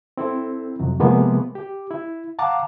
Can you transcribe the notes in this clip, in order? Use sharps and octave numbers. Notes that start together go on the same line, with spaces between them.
C4 E4 A4
F2 C3 F#3
C3 F3 G#3 A#3 B3
G4
E4
F5 F#5 A5 A#5 D6